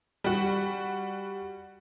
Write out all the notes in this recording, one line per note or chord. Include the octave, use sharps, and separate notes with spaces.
G3 F#4